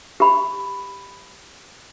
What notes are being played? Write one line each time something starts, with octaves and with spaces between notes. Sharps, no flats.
G4 B5